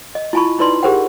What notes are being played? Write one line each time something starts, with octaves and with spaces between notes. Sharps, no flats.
D#5
E4 F4 G#5 A5 B5 C#6
D#4 E4 B4 D5 C6
G4 G#4 A#4 C5 F#5 G5